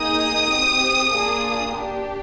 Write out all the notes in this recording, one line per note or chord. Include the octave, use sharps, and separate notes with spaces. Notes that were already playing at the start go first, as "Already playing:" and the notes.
Already playing: A#3 D#4 G#4 D#6
C4 G4
A#3 D4 F4 G#4
D4 G4